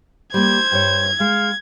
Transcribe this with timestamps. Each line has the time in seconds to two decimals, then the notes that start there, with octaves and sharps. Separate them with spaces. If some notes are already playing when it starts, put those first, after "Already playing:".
0.34 G3 A#3 C5 G#6
0.72 G2 G3 C#5
1.20 G#3 F5